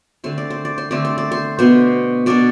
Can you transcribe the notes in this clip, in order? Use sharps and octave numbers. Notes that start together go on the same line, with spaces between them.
D3 A3 C4 C5
D5
C5
D5
C5
D3 A3 C4 D5
C5
D5
C5
B2 B3 D4 C5
B2 B3 D4 D5